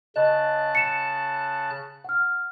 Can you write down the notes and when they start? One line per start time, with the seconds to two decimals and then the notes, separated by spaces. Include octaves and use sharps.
0.16 C#3 D#5 A5 F#6
0.75 C#7 E7
2.04 F#5 F6